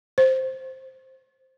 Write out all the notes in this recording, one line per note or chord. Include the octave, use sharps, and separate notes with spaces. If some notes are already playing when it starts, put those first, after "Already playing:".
C5